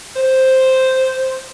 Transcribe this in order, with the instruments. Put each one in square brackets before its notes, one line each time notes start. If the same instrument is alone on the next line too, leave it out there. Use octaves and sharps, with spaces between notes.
[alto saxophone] C5